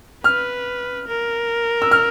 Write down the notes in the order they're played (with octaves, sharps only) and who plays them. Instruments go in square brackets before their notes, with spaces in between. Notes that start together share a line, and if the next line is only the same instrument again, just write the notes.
[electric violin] B4 [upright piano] F6
[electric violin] A#4
[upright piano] E6
F6